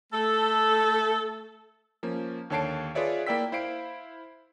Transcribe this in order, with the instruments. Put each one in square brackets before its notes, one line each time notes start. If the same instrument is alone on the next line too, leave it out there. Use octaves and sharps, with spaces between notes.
[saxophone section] A3 A4
[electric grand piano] F3 A#3 C#4
D#2 D3 C#5 A5 C7 D7
F4 G#4 B4 C#5 D5 E5
A#3 E4 D5 G5 E6 B6
E4 C5 F5 C7 D7